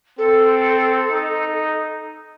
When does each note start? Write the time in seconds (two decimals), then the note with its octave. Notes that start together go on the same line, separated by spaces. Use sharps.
0.18 C4 A4
1.10 D#4